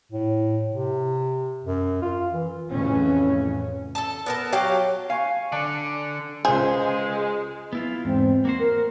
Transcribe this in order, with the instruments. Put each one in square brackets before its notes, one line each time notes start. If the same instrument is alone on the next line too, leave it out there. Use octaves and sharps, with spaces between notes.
[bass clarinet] A2
C3
F#2
F4
E3
[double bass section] F2 A2 C#3 E3 C#4
[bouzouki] A4 A5
B3 A#4 A5
F#3 G4 F5 G5
[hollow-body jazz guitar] F5 [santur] G#5 C#6
[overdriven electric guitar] D3 [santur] D4
[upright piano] C#2 C5 [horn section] G#3 [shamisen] G#4
[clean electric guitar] B3 E4 F4
[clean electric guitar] E2 G#2 [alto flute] C4
[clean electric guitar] A#3 F#4 C5
[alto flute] A#4